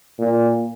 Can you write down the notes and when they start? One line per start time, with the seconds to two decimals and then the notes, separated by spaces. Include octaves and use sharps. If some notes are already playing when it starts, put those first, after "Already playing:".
0.19 A#2